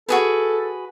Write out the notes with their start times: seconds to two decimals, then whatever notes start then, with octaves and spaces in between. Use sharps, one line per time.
0.09 F#4 G#4 A4 B4